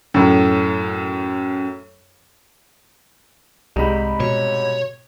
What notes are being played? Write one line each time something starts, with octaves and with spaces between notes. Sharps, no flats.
F#2 A2
C2 G#2 C3 G3 G#3 D#4 B5
B2 C#5